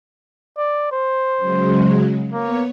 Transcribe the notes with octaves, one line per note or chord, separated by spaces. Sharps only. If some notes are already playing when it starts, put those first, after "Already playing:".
D5
C5
C#3 F#3 G#3
A#3 B3 C#5